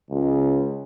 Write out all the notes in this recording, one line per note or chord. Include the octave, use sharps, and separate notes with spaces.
C#2